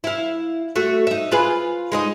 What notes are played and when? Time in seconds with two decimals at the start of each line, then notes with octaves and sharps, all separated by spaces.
0.04 E4 F5
0.76 A3 F#4
1.07 D#4 E5
1.31 F4 G#4 B4
1.92 G#3 D#4 D#5